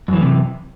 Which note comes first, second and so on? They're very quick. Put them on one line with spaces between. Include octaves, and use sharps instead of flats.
F#2 E3 A2 C3